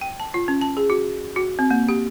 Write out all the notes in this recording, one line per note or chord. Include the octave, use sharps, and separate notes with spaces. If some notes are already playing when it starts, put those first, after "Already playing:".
G5
A5
F4
C#4
A5
G#4
F#4
F#4
C4
A#3
G4